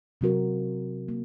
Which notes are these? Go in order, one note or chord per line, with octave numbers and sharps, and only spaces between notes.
C3 F#3 C4 F#4 A#4
A#3